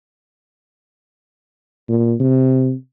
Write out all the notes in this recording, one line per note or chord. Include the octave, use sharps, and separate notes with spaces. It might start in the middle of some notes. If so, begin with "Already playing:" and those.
A#2
C3